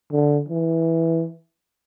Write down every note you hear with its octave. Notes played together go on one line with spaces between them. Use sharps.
D3
E3